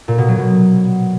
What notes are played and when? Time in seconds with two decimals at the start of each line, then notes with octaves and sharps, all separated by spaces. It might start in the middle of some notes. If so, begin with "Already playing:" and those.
0.08 A#2
0.18 B2
0.28 F#3
0.39 B2